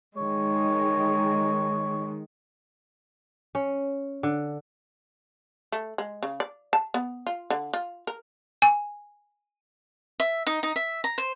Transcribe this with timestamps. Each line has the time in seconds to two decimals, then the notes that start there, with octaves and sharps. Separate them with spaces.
0.17 D#3 G#3 C#5
3.55 C#4
4.23 D3
5.72 A3
5.98 G#3
6.23 C#3
6.40 D5
6.73 A5
6.94 B3
7.27 F4
7.50 D3
7.74 F4
8.07 A#4
8.62 G#5
10.20 E5
10.47 D#4
10.63 D#4
10.76 E5
11.04 A#5
11.18 C5